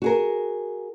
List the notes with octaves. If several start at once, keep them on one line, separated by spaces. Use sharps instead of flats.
F#4 G#4 A#4